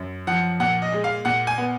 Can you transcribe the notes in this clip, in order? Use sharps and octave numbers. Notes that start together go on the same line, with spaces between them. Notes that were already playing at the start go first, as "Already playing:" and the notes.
Already playing: F#2
F3 F#5
A#2 F#5
D#5
G#3
F5
A#2 F#5
G#5
B3